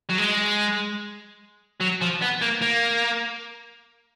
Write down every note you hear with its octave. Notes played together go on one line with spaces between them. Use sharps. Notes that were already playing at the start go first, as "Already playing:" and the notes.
F#3
G#3
F#3
F3
B3
A#3
A#3